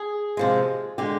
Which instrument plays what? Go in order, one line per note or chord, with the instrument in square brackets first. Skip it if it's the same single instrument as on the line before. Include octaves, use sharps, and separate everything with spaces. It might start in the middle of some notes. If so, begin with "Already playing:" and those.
Already playing: [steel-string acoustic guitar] G#4
C3 F3 G#3
D3 G#3 G4